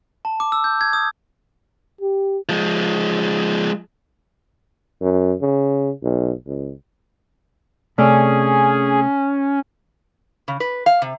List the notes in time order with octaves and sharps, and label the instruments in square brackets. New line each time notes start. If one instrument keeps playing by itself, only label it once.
[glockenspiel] A5
D6
E6
G6
G#6
D#6
[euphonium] G4
[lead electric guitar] F3 G#3
[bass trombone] F#2
C#3
B1
C#2
[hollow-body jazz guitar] C3 A3 D5 [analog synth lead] C#4 [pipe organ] G#4
[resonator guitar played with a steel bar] C#3
B4
F5
C3